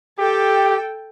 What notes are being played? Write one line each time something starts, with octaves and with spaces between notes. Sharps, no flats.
G4 A4 G5